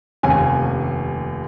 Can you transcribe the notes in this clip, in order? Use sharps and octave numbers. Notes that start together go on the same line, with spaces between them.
F1 D#2 C3 C#4 G#5